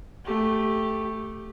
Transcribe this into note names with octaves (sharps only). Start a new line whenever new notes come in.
A3 G4